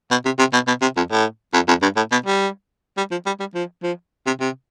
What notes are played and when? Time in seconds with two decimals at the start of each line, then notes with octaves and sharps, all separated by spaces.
0.11 B2
0.25 C3
0.39 C3
0.53 B2
0.67 B2
0.82 C3
0.97 F2
1.11 A2
1.54 F2
1.68 F2
1.82 G2
1.97 A2
2.12 B2
2.26 G3
2.97 G3
3.11 F3
3.26 G3
3.40 G3
3.55 F3
3.83 F3
4.27 C3
4.40 C3